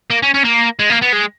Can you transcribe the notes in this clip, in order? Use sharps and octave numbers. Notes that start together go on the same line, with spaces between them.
A#3
C#4
C#4
A#3
G#3
A#3
B3
G#3